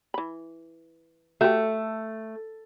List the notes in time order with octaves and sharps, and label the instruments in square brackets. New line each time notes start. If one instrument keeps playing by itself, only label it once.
[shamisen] E3 B5
[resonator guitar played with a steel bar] A3 [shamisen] F#4 G4